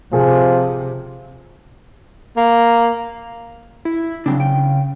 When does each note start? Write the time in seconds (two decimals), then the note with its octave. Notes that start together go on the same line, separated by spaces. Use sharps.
0.13 C3 F3 G#4
2.37 A#3
3.85 E4
4.26 C#3 F#3 C4 D4
4.40 G5